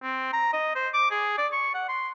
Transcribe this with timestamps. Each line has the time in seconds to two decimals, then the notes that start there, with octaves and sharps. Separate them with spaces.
0.03 C4
0.33 A#5
0.53 D#5
0.75 C5
0.94 D6
1.11 G#4
1.38 D5
1.52 C#6
1.74 F#5
1.89 C6